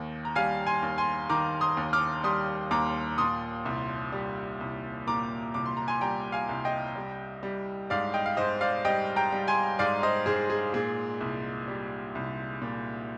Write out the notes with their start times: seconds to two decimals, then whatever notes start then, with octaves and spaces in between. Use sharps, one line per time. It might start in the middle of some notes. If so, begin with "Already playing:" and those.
Already playing: D#2 D#3
0.25 A#5
0.36 G3 F5 G#5
0.66 G#5 C6
0.82 D#2
0.98 G#5 C6
1.29 D#3 A#5 D6
1.61 C6 D#6
1.77 D#2
1.93 D6 F6
2.24 G3 C6 D#6
2.71 D#2 A#5 D6
3.18 A#2 C6 D#6
3.65 C2
4.12 G3
4.61 C2
5.07 A#2 A#5 D6
5.54 C2 D6
5.66 C6
5.77 A#5
5.88 G#5 C6
6.01 G3 G5 A#5
6.32 F5 G#5
6.49 C2
6.65 D#5 G5
6.96 G3
7.43 G3
7.90 G#2 D5 F5
8.14 D#5 G5
8.26 F5
8.37 G#2 C5 D#5
8.61 D5 F5
8.85 G3 D#5 G5
9.16 G5 A#5
9.32 G3
9.47 G#5 C6
9.79 G#2 D5 F5
10.03 C5 D#5
10.26 G#2 G#4 C5
10.50 G#4
10.74 A#2 G#4
11.21 C2
11.68 G3
12.15 C2
12.62 A#2